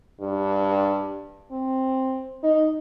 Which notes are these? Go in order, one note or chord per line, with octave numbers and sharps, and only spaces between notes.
G2
C4
D#4